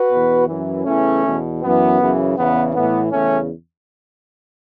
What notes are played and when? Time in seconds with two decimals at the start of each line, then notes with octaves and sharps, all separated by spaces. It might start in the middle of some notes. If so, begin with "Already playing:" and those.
Already playing: F#4 B4
0.10 E2 B2
0.47 F#2 E3
0.85 E2 C#3 E3 A3 C#4
1.23 E2 B2
1.61 F#2 E3 B3
1.99 F#2 C#3 E3
2.36 E2 C#3 E3 B3
2.74 A2 E3 B3
3.12 E2 C#3 A3 C#4